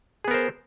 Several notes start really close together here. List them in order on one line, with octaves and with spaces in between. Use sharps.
G#4 B3 A#4 C5